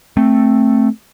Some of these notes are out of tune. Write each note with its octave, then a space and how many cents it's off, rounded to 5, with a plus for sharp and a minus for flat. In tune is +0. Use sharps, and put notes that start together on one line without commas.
A3 +5 C4 +10